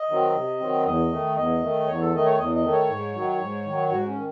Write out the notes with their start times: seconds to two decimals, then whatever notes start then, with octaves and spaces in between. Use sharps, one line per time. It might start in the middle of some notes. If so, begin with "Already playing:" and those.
Already playing: D#5
0.09 D#3 F#3 C4
0.35 C3
0.60 D#3 F#3 C4
0.86 E2 D#5
1.11 D#3 A3
1.36 E2 D#5
1.62 D#3 A3
1.87 E2 C#5
2.00 A4
2.12 D#3 A3 D#5
2.26 C#5
2.38 E2 D#5
2.55 D#5
2.64 D#3 A3
2.72 C#5
2.89 G#2
3.14 D#3 F#3
3.40 G#2
3.65 D#3 F#3
3.89 G#2 F#4
4.07 C#4
4.16 D#3